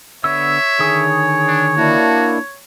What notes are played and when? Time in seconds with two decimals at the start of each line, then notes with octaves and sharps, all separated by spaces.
0.24 D3 B3 C#5 E5 E6
0.79 D3 D#3 G#4 D#6
1.47 D4
1.77 A#3 D4 E4 F#4